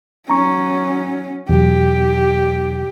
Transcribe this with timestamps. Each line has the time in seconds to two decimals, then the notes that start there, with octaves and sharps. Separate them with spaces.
0.30 F#3 C#4 A#5 C#6
1.49 E2 B2 F#3 G4